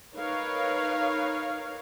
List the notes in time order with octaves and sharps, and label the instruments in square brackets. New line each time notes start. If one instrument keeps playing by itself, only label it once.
[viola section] D#4 A#4 B4 C#5 F5